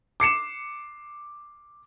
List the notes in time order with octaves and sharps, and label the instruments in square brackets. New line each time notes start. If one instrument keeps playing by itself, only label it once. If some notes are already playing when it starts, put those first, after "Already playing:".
[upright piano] D6 C7 C#7 E7